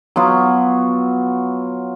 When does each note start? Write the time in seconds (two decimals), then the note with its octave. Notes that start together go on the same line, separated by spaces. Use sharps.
0.16 F#3 B3 F4